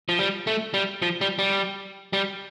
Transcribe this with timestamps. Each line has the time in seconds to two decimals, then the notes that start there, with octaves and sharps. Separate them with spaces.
0.09 F3
0.19 G3
0.47 A3
0.74 G3
1.02 F3
1.21 G3
1.39 G3
2.13 G3